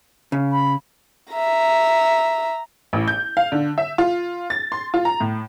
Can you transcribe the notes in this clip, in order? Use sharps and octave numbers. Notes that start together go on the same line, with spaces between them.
C#3
B5
E5 A#5
A1
G6
F5
D3
E5
F4
A6
C6
F4
A#5
A2